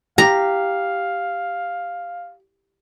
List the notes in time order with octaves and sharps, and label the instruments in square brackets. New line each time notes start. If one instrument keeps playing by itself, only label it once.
[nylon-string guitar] G4 [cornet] F5 [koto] A#5